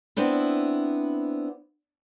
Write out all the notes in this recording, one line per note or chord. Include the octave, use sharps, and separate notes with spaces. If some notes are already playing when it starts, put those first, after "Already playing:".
B3 C4 D4 E4